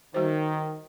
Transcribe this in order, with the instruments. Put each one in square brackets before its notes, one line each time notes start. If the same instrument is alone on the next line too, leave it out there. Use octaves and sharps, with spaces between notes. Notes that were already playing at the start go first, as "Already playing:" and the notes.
[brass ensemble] D#3 [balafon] G3 F#4 C5